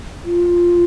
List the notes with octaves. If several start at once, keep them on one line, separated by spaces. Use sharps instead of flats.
F4